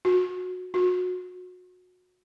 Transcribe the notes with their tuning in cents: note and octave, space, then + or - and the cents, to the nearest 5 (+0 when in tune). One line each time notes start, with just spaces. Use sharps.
F#4 -25
F#4 -30